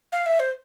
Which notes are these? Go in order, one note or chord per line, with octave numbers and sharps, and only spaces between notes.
F5
E5
C5